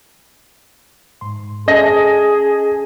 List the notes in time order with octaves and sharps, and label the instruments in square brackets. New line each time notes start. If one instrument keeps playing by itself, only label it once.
[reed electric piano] G#2 C6
[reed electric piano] C#4 A4 A5 [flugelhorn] G#4 [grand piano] D#5 A#6